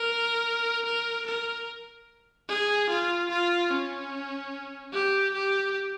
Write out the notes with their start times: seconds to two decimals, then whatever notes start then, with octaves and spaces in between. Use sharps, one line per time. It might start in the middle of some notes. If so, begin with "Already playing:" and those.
Already playing: A#4
0.85 A#4
1.26 A#4
2.48 G#4
2.89 F4
3.30 F4
3.70 C#4
4.93 G4
5.34 G4